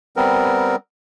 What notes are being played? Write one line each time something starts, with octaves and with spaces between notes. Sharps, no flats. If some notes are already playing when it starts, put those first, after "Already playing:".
G3 B3 C4 A#4